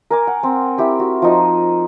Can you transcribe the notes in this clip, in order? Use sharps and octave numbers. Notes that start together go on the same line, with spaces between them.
A#4 G#5 D6
F#5
C4
E4 G4 G5
F#4
F3 D#4 D#5